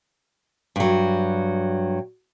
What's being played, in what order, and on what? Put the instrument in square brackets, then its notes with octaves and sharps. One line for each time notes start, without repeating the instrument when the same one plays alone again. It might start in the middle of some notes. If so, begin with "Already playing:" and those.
[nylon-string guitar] G2 F#3